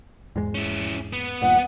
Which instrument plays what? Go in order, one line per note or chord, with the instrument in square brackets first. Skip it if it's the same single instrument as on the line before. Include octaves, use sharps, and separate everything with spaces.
[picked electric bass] E2 G#2 G#3
[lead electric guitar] C#4 E4
B3
[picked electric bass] D#1 G2 A#2 [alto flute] F#5